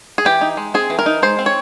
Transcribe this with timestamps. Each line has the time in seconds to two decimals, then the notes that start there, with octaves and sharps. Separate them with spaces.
0.18 G#4
0.25 E3 G4
0.41 D#4
0.57 G#3
0.74 C4 G#4
0.90 E3
0.99 A#4
1.06 D#4
1.22 G#3 C5
1.39 C4
1.46 C#5